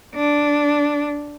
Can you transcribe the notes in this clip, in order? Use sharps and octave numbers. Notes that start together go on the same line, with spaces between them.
D4